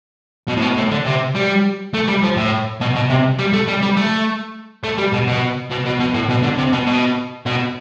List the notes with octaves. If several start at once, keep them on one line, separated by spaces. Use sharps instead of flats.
B2
A2
B2
A2
D3
C3
G3
A3
G3
F3
A2
B2
B2
C3
G3
A3
G3
G3
A3
A3
G3
B2
B2
B2
B2
B2
A2
B2
D3
C3
B2
B2
B2